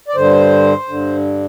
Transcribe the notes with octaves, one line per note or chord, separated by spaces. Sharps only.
D5
G2 D3 C5
G2 D3